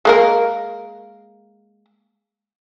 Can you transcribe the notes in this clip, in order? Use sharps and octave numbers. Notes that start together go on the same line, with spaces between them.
G#3 A#3 A#4